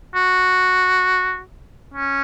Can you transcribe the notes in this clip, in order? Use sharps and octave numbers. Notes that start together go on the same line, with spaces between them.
F#4
C#4